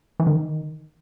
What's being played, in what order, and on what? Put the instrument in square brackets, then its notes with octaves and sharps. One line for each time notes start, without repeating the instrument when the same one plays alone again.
[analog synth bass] E3
D#3